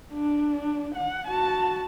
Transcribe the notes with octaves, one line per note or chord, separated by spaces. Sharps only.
D4
F#5
F#4 A5